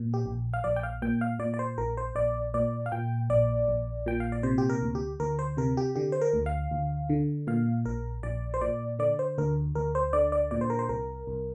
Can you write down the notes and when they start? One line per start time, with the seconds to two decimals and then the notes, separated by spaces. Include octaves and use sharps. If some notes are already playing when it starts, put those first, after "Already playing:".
Already playing: A#2
0.14 G4
0.26 A#1
0.53 F5
0.64 A#1 D5
0.76 G5
0.83 F5
1.02 A#2 G5
1.21 F5
1.39 A#2 D5
1.54 D5
1.59 C5
1.78 A#1 A#4
1.97 C5
2.15 A#1 D5
2.54 A#2 D5
2.86 F5
2.92 A#2 G5
3.30 A#1 D5
3.68 A#1
4.06 A#2 G5
4.20 F5
4.32 D5
4.43 C3 C5
4.58 G4
4.69 A#4
4.82 D2
4.95 G4
5.20 D2 A#4
5.39 C5
5.57 C3 A#4
5.77 G4
5.95 D3 G4
6.12 C5
6.21 A#4
6.34 D2
6.46 F5
6.71 D2
7.10 D3
7.47 A#2 F5
7.85 A#1 A#4
8.23 A#1 D5
8.54 C5
8.61 A#2 D5
8.99 D3 D5
9.19 C5
9.38 D2 A#4
9.75 D2 A#4
9.95 C5
10.13 D3 D5
10.32 D5
10.51 A#2 D5
10.61 C5
10.70 A#4
10.79 C5
10.89 C2 A#4
11.27 C2